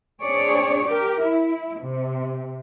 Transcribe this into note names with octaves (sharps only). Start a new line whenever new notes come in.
C4 D4 G#4 C#5 D5
G4 A#4
E4
C3